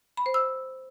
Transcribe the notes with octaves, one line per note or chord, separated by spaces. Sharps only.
B5
C5
E6